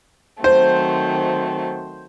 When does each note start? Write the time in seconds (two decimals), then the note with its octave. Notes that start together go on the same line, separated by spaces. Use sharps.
0.43 D#3 F#3 A3 C4 C5